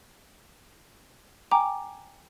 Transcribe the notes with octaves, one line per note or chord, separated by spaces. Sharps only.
G5 G#5 A#5 D6